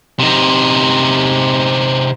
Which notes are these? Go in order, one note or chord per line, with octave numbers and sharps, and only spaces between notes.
C3 D#4